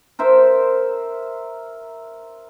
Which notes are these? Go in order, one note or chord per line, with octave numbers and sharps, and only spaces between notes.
A#4 C5 E5